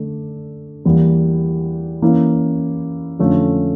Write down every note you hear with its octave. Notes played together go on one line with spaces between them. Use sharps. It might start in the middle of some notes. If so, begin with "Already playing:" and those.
Already playing: D3 A3 D4 A4
E2 E3 G3 A#3
E3 A#3 C#4 E4
F2 D3 A3 C#4 F4